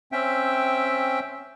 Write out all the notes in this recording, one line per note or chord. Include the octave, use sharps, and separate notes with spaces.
C4 C#4 E5 G5